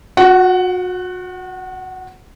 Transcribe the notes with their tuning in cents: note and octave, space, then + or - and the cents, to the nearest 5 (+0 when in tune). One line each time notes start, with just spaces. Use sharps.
F#4 -35 F#5 +15